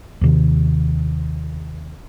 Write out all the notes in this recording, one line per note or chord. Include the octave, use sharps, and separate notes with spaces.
D#2 C3 D#3